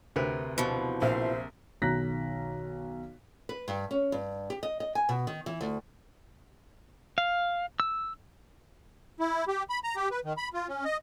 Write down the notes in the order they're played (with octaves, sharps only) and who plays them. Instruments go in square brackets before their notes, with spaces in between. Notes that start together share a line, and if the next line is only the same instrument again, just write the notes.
[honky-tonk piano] D2 [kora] C3 A#4 B4
[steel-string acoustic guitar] B2 E3 F3
[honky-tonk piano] A#1 E5 [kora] A#4 F5 [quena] C5
[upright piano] B1 D#3 A#5 F#6 A#6 B6
[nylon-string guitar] B4
G2
C#4
G2
G4
D#5
D#5
G#5
B2
D#3
E3
D2
[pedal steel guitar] F5
E6
[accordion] E4
G4
B5
A#5
G4
B4
D#3
B5
F4
C#4
D#5